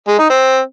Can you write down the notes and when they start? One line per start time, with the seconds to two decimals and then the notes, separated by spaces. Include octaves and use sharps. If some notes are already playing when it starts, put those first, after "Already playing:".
0.08 G#3
0.19 D#4
0.30 C4